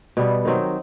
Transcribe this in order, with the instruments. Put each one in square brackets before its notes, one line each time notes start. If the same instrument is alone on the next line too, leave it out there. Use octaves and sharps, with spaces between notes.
[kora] B2 G3 B3
D#3 F#3 C4 D#4